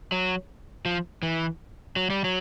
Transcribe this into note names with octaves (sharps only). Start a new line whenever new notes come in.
F#3
F3
E3
F#3
G3
F#3